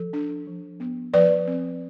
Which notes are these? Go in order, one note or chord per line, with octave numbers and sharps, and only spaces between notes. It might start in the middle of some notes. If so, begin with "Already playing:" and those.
Already playing: F3 A4
D4
F3
B3
F3 B4 D5
C4